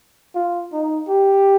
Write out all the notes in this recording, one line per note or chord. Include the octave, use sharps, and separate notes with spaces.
F4
D#4
G4